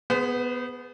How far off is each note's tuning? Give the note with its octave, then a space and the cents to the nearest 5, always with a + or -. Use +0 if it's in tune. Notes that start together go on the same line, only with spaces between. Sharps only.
B3 +0 G#4 +5 C5 -40